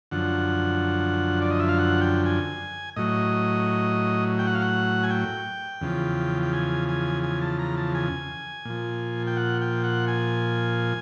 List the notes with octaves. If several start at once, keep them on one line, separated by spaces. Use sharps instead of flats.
F#2 D3 F3 F#5
D5
D#5
E5
F5
F#5
G5
G#5
A2 F#3 D#5
G5
F#5
F5
F#5
G#5
G5
E2 C#3 F3
G5
G#5
G#5
G#5
A5
A#5
A5
G#5
A#2 F3
G5
F#5
G5
F#5
G#5